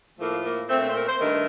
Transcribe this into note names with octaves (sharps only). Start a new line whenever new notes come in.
A2 F3 A3 A#3
A#3
A#2 A3 C4
C4
C5
A#4
C5
G2 D#3 A3 A#4